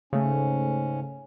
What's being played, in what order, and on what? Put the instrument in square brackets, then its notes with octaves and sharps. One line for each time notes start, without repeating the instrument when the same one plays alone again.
[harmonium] G#2 C#4 [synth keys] C#3 A3